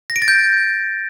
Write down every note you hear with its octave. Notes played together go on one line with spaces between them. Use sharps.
A#6
D7
A6
G6